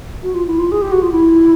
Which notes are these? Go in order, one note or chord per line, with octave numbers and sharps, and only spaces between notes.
F#4
F4
E4
F4
G#4
G4
F#4
F4
E4